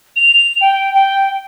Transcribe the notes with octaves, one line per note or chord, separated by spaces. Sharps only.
F7
G5
G5